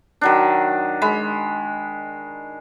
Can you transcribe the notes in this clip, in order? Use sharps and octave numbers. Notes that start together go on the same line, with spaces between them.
D#3 F#3 D4
G#3 B5